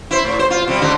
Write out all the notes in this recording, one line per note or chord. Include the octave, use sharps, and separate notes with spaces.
E4 C5
A2
C5
F4
C3 G3
G#2 D3 D#4